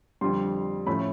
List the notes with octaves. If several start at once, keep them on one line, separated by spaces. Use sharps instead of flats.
F2 D3 G3 C6
A2 F3 A3 C#4 B5